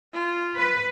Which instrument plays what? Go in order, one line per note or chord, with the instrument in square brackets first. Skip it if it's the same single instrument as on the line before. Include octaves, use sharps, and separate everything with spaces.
[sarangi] F4
[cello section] B4